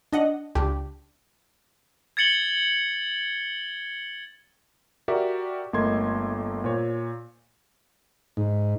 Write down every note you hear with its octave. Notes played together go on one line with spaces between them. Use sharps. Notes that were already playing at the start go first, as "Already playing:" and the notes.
D4 D#5 F#5
C#2 D4 G4
G#6 A6 C#7 F#7 G7
F#4 G4 A#4 D5 E5
G1 A3 A#3 D#5 C6 G#6
A#2 C5 C#5
G#2